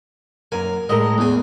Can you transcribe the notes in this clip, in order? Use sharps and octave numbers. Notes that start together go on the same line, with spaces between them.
F#2 A#3 G#5
A2 G#3 A#4 D#5
E2 G#5